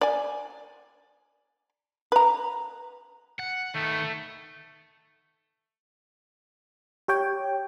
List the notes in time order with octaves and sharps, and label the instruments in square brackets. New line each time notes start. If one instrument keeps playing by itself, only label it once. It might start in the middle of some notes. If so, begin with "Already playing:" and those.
[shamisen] D5 G#5
B4 A#5
[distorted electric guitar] F#5
[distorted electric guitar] D#3 B3 [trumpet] A3
[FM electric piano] G4 C#5 G5